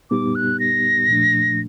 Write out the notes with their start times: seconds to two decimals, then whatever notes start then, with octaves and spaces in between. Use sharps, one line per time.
0.10 A#2 G3 B3 D#4 G4 D6
0.35 F#6
0.60 A#6
1.08 A#2 F3 A3 D4